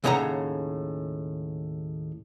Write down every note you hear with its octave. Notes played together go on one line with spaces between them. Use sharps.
D#2 A2 C#3 C#5 F#5 A#5